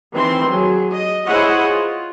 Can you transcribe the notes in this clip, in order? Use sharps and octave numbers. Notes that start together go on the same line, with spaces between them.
D#3 E3 C4 C6
F#3 G#4
D#5
E4 G#4 C5 C#5 D#5 F#5
F4